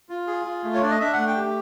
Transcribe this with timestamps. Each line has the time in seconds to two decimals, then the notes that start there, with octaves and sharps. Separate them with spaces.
0.09 F4
0.27 G#4
0.45 F4
0.64 A3
0.74 C#5
0.81 D4 D5
0.90 D#5
1.00 D4 E5
1.13 A3 F#5
1.27 G5
1.36 G4